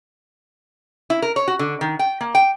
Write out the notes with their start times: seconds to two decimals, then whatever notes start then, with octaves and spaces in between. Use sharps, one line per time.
1.10 E4
1.22 A#4
1.36 C#5
1.48 F#4
1.59 D3
1.81 D#3
1.99 G5
2.21 A#3
2.35 G5